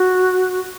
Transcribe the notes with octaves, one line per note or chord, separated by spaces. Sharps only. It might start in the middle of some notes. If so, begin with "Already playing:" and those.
Already playing: F#4